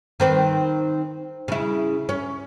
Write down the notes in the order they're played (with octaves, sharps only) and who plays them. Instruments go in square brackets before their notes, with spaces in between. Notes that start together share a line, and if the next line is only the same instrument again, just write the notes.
[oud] D#3 C4 B4
C#3 E4
C#4